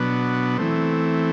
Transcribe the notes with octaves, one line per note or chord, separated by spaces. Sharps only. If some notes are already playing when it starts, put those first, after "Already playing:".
Already playing: B2 F#3 B3 D4
E3 A3 C4